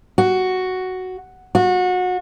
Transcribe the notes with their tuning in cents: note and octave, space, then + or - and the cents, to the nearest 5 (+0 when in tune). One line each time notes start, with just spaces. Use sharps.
F#4 +5
F#4 -25